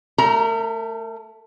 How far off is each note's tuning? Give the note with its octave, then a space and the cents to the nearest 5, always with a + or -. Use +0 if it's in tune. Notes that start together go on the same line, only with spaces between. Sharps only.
A3 +0 A#4 -35 A#5 +10